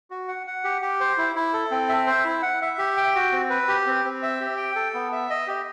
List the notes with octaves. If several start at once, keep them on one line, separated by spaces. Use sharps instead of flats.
F#4
F#5
F#5
G4
G4
C5
E4
E4
A4
C4
E5
C5
E4
F#5
E5
G4
G5
F#4
C4
B4
G4
C4
C4
E5
G4
G5
A4
B3
E5
D#5
G4